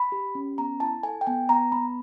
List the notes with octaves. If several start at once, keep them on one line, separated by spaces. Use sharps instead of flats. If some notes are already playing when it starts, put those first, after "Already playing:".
Already playing: B5
G4
C#4
B3 A#5
E4 A5
A4 G#5
G5
B3 G#5
B3 A#5
B3 B5